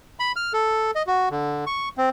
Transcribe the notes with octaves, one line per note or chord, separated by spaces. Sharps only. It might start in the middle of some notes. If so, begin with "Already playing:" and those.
B5
F6
A4
D#5
F#4
D3
C#6
C4